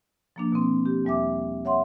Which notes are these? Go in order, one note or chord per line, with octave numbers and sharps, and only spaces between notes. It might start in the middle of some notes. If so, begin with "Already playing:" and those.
F3 A#3 D4
B2 C4
G4
E2 G3 E5 D6
C#5 E5 F#5 C6